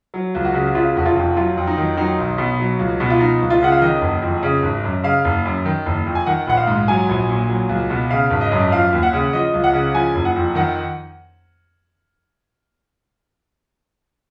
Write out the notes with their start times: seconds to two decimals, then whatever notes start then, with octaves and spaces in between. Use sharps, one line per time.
0.14 F#3
0.35 C#2
0.45 F#4
0.54 C#3
0.75 C#3 F4
0.95 F1 F#4
1.06 F4
1.16 F2
1.36 F#3 F4
1.57 F2
1.67 D#4
1.78 D#3
1.97 F#3 D#4
2.18 B1
2.38 B2
2.60 F#3
2.79 C#2
3.00 B2
3.10 F4
3.20 F3 D#4
3.41 C#2
3.50 F4
3.62 C#3 F#5
3.72 F5
3.81 D#3 D#5
4.01 F#1
4.22 F2
4.43 C#3
4.63 G#1
4.84 F#2
5.04 C#3 F5
5.25 F#1
5.45 F#2
5.65 D#3
5.86 F#1
6.06 F2
6.15 G#5
6.26 D#3 F#5
6.47 A#1 F#5
6.57 F5
6.67 G#2
6.88 F#3 G#5
7.09 A#1
7.28 A#2
7.49 F#3
7.69 C#2
7.90 B2
8.10 C#3 F5
8.30 G#1
8.41 D#5
8.52 F#2
8.72 F3 F5
8.92 D#2
9.03 F#5
9.13 C#3
9.33 F3 D#5
9.54 C#2
9.64 F#5
9.73 C#3
9.94 F3 G#5
10.15 F#1
10.25 F#5
10.36 F2
10.55 D#3 F#5